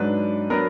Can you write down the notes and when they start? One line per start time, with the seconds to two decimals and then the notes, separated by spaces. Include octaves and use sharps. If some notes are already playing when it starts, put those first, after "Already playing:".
Already playing: G#2 F#3 D4 B4
0.50 F#3 B3 D4 A#4